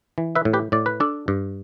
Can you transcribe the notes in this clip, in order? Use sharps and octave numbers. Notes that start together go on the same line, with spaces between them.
E3
B4 E5
A2
G4 B4
A2 D5
B4
D4 A4 D5
G2